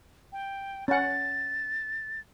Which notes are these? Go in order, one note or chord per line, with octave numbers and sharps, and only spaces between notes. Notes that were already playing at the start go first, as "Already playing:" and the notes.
G5
C#4 F#5 A6